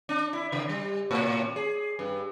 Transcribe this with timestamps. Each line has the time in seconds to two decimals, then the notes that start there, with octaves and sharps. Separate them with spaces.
0.09 D4
0.33 E4
0.52 C#3
0.69 G3
1.11 A2
1.56 G#4
1.99 G2